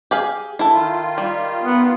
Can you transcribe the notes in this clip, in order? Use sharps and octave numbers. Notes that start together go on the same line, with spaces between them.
G4 G#4 F5
E4 A4
D#3 F4
G3
B3